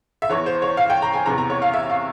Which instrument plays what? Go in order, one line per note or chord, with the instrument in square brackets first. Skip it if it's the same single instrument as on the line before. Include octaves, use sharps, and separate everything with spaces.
[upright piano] E5
E2 E3 C#5
C5
C#5
F5
G5
A#5
G#5
E2 C3 E3 A#5
A#5
C#5
F5
E5
F5